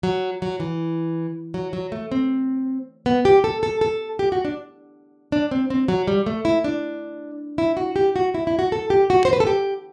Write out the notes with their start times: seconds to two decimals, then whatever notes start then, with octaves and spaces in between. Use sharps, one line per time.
0.03 F#3
0.42 F#3
0.60 E3
1.54 F#3
1.73 F#3
1.92 A3
2.12 C4
3.06 B3
3.25 G4
3.44 A4
3.63 A4
3.81 A4
4.19 G4
4.32 F#4
4.45 D4
5.32 D4
5.51 C4
5.70 C4
5.88 F#3
6.07 G3
6.26 A3
6.45 E4
6.64 D4
7.58 E4
7.77 F#4
7.96 G4
8.16 F#4
8.34 E4
8.47 E4
8.59 F#4
8.72 A4
8.90 G4
9.10 F#4
9.25 C5
9.33 B4
9.40 A4
9.47 G4